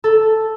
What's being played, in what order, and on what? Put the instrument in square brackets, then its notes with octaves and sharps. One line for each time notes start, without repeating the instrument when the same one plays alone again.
[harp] A4